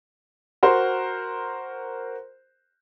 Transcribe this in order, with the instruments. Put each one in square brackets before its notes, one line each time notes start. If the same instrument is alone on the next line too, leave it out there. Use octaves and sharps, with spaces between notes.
[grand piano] F#4 A#4 C5